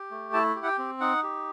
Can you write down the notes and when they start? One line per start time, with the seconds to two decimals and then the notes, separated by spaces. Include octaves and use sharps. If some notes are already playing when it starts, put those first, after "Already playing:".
Already playing: G4
0.11 A3
0.33 E4 A5
0.56 G4
0.63 F#5
0.67 G5
0.78 C4
1.01 D#4 F#5
1.23 G4